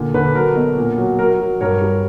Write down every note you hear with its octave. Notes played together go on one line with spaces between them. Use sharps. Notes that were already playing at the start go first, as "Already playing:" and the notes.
Already playing: A#2 D3
D3 B4
F#3 A#4
B2
A#2
F#3
F#3 A#4
F#3
G2 A#4 C#5
G3